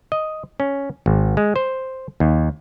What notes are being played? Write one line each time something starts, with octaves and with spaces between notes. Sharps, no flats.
D#5
C#4
G#1
G#3
C5
D#2